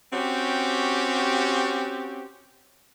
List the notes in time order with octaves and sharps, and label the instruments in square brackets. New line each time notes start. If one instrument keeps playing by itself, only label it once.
[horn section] C4 C#4 F#4 G4